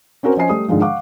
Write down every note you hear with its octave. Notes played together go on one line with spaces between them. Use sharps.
C4 C#4 F#4 A#4 C5
F3 C#4 C5 D#5 G#5 C7
G3 A3 D#6
G#2 D3 D#3 F3 G#3
F5 F#5 C#6 D6